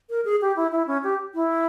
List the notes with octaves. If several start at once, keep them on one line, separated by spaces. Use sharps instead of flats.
A#4
G#4
G4
E4
E4
C#4
G4
E4